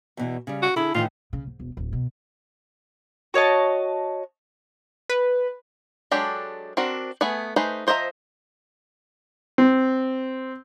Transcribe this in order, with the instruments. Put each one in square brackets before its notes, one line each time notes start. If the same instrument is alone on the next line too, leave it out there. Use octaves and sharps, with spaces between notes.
[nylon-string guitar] E2 B2 E3
C#3 G3
[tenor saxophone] F#4
[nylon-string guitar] D3 G#4 A4 [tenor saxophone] E4
[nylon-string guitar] A2 D#3 E3 [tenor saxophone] F4
[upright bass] C#3
G#2
E1
D1
B2
[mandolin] F#4 C#5 D#5 A5
[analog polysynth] B4
[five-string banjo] F#3 G#3 D4 G4 A4
C4 D4 F#4 A#4
A3 B3 G#4 G#5
A3 D#4 G#4 B4 C5
F3 C5 D#5 E5 A#5
[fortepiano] C4